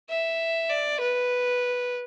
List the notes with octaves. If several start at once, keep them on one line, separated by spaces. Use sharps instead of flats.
E5
D5
B4